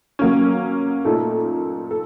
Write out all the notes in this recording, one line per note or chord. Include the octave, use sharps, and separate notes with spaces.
F#3 A#3 C#4
A#2 A3 D#4 A4
A4